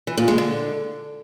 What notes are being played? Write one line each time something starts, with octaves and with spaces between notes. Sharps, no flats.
E3
A#2
G#3
D3